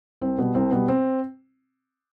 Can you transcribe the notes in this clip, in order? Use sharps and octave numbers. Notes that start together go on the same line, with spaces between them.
C2 C4
B2 G3 B3
C2 C4
B2 G3 B3
C4